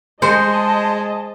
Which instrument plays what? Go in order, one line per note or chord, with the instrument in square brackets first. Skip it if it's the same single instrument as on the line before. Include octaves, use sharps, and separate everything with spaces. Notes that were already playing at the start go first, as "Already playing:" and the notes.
[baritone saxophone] G#3 [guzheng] C5 [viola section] D#5 A5